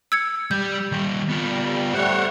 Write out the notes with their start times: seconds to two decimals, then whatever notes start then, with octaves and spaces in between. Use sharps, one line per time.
0.12 E6 G#6 C#7
0.51 G3 G4 G6
0.92 D#3 G3
1.29 B3 F4
1.49 G3
1.94 G3 A3 C5 C#5 F#5